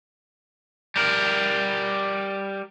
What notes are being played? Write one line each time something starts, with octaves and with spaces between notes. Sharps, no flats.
G3 A#4